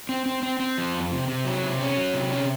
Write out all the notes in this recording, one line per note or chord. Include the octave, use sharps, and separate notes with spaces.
C4
C4
C4
C4
F3
F2
C3
C3
F#3
C3
C#4
F#3
C3
C#4